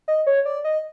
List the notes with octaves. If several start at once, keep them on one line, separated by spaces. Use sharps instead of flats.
D#5
C#5
D5
D#5